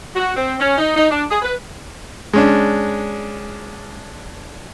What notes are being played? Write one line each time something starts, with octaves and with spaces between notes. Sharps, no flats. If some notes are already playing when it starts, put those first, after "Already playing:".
F#4
C4
C#4
D#4
D#4
D4
G#4
B4
G#3 C#4 D4